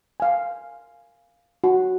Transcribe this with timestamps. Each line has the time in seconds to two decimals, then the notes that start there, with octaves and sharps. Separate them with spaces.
0.20 F5 G#5
1.64 F#4